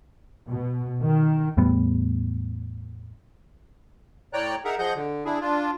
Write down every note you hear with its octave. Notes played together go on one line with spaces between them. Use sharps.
B2
D#3
E2 A2 G3 B3
A2 C#5 D5 G5 A#5 F#6
D#4 G#4 A#4 E5 F#5 A#5
F3 G#4 D#5 F#5 G6
D3
D4 E4 G#4
D4 F4